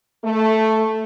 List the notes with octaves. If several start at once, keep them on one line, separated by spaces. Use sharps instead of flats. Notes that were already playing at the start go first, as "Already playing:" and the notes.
A3